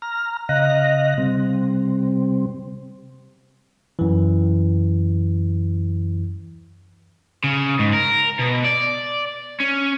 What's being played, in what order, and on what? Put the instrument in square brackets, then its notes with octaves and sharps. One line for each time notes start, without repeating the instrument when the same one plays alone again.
[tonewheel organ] A#5 F6
C#3 D#5 F5 F#6 A#6
C3 G3 C4
[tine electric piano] F#2 E3
[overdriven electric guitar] C#3
G#2
A#4
B2
D5
C#4